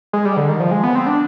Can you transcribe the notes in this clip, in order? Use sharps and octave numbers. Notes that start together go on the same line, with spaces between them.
G#3
G3
D3
D#3
F3
G#3
B3
C4
D4